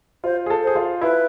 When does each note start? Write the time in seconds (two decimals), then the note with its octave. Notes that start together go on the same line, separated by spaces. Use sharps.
0.24 F4 C5
0.46 G#4
0.50 A4
0.64 G#4 C5
0.76 F4
1.01 E4 B4